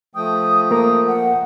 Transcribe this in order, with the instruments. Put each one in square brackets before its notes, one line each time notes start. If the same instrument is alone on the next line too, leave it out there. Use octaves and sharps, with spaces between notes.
[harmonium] F3 A3 G5 [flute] D#6
[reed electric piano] A#3 A#4 [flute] D#6
[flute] F#5